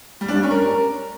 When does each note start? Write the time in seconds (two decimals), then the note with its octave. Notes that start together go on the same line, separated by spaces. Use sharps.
0.21 G3
0.28 D4
0.36 G3
0.43 C#4
0.51 A#4